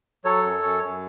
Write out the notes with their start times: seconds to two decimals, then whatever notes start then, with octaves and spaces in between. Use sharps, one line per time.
0.25 F#3 A4 C#5
0.44 F#2
0.63 F#2
0.83 F#2